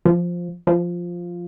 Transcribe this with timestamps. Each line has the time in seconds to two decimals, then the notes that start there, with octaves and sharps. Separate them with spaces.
0.05 F3
0.67 F3